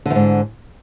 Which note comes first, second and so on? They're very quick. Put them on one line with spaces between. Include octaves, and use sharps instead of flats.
D3 E2 G#2